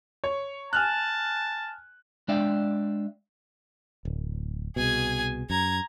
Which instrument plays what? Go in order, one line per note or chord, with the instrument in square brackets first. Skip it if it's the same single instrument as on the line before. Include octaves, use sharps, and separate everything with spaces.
[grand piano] C#5
[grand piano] G#5 F6 F#6 [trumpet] A5
[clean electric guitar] G#3 D4 D5 E5 F5 G5
[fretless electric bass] D1
[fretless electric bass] C2 B2 [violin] G#4 G#5
[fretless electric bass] F#2 [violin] A#5 G#6